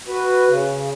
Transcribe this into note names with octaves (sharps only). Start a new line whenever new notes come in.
F#4 B4
C#3